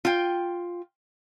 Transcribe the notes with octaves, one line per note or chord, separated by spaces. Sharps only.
F4 G5